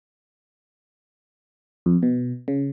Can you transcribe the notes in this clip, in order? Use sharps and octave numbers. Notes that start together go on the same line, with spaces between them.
F2
B2
C#3